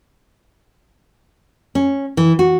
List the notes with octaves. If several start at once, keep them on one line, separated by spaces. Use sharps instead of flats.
C#4
E3
F#4